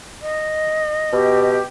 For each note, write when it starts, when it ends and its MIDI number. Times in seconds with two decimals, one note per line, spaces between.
0.21 1.55 75
1.13 1.62 47
1.13 1.63 67